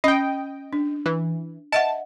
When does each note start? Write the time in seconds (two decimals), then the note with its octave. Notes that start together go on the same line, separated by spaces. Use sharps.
0.04 C#4 D#5 G5
0.73 D4
1.06 E3
1.72 D#5 E5 F#5 A5